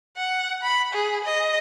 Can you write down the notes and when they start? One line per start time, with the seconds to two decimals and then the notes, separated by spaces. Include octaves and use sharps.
0.17 F#5
0.63 B5
0.93 G#4
1.25 D#5